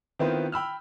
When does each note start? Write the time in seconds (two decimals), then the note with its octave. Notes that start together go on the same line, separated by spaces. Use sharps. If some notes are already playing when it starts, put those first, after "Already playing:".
0.19 D#3 B3 C4 E4 F4 B4
0.52 G5 B5 E6 F6